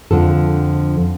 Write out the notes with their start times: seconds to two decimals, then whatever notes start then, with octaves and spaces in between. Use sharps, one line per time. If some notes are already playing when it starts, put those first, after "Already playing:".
0.11 F2 D3 F3 A4